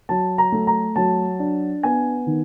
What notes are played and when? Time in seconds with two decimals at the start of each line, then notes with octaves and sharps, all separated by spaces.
0.09 F#3 A5
0.38 A#5
0.52 A3
0.67 A#5
0.96 F#3 A5
1.39 D4
1.83 B3 G#5
2.26 D#3